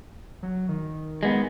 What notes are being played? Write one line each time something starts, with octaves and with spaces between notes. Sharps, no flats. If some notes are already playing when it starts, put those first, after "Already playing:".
F#3
D#3
G#3 B3